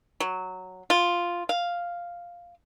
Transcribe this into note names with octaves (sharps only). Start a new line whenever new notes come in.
F#3
F4
F5